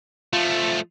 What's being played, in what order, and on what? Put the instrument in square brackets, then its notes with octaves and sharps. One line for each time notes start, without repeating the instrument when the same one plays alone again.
[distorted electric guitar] F3 A3 [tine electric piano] F4